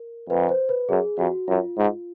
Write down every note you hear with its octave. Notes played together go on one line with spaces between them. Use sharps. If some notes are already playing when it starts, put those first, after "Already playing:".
Already playing: A#4
F2 B4
C5
B4
F#2 G#4
F2 F#4
F#2 F4
G#2